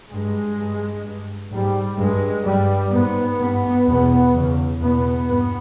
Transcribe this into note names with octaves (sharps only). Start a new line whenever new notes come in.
G2 G#3
G2
G2
G#2 G3
G2 G#3
G2 G3
G#2 B3
G2 B3
E2 B2 B3
E2 C#3
E2 B2 B3
G2 B3